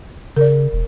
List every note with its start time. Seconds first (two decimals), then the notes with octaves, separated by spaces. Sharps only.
0.36 C#3 A#4 D5
0.73 E1